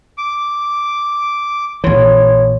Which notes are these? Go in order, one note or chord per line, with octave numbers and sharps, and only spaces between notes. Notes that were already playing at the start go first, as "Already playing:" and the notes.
D6
A#1 E3 C#5 C6